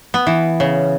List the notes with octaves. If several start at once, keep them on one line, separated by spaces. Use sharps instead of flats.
B3
E3
C#3